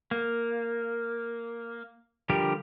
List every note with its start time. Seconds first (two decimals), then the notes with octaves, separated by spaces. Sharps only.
0.11 A#3
2.30 D3 F3 G3 G4 A#4